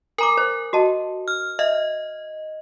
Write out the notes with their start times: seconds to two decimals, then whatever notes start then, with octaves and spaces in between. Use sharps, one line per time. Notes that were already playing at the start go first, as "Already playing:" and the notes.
0.18 A#4 G#5 A#5 D6
0.37 C5
0.73 F#4 D#5 A5
1.28 F6
1.59 D#5 E5